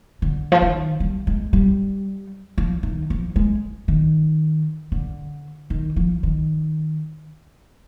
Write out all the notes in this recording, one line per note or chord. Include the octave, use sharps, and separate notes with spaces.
D3
F3
D#3
G3
G#3
G3
F3
D#3
F3
G#3
D#3
D3
D#3
F3
D#3